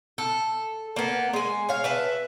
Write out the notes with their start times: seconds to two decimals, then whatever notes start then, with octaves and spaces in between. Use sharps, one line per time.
0.18 A4
0.96 A#3 B3
1.33 G#3 G#5
1.69 C#5 F5
1.84 B4 E5 A5